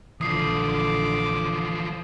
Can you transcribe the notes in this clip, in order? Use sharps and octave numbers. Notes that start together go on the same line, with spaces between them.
A#1 D3 E3 F3 D6 D#6 C7